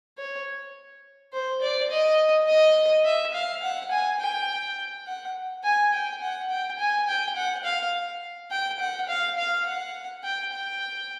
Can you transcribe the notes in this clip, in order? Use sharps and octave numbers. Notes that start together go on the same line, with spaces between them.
C#5
C5
D5
D#5
D#5
E5
F5
F#5
G#5
G5
F#5
G#5
G5
F#5
G5
G#5
G5
F#5
F5
G5
F#5
F5
F5
F#5
G5
G5